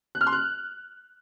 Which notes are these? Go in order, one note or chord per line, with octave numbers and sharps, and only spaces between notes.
F#6
F6
C6
F#6